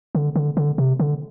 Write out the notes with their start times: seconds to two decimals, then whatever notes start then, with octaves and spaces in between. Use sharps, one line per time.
0.15 D3
0.36 D3
0.57 D3
0.78 C3
1.00 D3